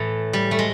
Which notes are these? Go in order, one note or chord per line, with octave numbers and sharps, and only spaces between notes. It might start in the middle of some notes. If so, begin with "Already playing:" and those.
Already playing: A2 E3 A3
G3
A3
G#3